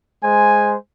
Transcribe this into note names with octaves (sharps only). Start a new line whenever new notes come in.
G#3 C5 G#5